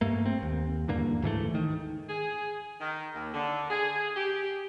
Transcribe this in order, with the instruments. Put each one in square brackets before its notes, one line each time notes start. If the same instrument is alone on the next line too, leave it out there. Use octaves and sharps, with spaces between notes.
[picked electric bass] G2 A3 A#3
C4
D#2
E2 G2 D3 A#3
D2 G#2 E3 A3
D#3
[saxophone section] G#4
D#3
D#2
D3
G#4
G4